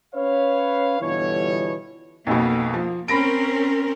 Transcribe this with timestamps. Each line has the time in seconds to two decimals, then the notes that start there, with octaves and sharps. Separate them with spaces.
0.15 C#4 B4 C#5 F5
1.01 G1 B2 E3 C#5
2.27 B1 F2 B2 A#3
2.73 F3
3.08 C4 C#4 A#4 B5 A#6 D7